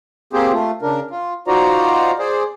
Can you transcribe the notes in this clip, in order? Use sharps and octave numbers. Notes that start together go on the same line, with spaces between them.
A#3 C4 G4 G#4 C5
A3 F4
C#3 D4 A#4
F4
D#4 F4 F#4 C5 D5 A#5
G#4 C5 D5